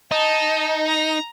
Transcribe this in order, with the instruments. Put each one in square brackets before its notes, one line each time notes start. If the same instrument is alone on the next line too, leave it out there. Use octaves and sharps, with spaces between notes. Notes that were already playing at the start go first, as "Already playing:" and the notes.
[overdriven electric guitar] D#4 [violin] A5
[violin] A#5